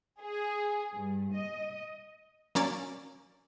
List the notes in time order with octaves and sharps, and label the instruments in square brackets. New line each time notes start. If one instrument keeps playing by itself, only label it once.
[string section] G#4
G2
D#5
[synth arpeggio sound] F#3 A#3 C#4 D5 A6